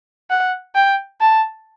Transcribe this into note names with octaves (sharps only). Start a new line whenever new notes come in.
F#5
G5
A5